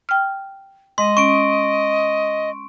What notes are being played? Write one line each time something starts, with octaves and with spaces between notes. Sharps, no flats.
G5 F6
G#3 D#5 C6
C#4 C#6 D7